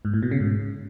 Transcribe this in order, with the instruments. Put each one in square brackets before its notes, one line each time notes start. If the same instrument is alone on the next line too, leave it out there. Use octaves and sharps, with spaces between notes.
[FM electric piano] G#2
A2
B2
C#3
G#2